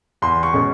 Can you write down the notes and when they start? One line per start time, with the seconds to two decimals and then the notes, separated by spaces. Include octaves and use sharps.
0.22 E2 C6
0.43 C#6
0.53 B2 G#3 C#4